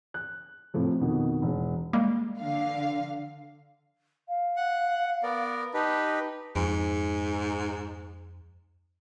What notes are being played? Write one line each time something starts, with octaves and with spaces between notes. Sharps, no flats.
F#6
A2 C3 F3
F2 B2 D#3
E1
G3 G#3 A#3
D3 F5
F5
F#5
B3 A#4 D5
D#4 G4 B4 A5
F2 G#2